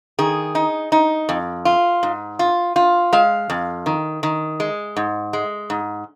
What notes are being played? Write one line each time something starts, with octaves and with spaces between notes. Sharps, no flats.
D#3 G#4
D#4
D#4
F2
F4
G#2
F4
F4
G#3 F5
F2
D#3
D#3
G#3
G#2
G#3
G#2